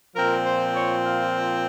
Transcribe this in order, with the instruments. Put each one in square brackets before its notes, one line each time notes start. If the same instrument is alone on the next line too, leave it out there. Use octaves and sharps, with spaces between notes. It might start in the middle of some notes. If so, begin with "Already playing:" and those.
[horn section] A#2 F3 C4 A#4
C5
C#5
F5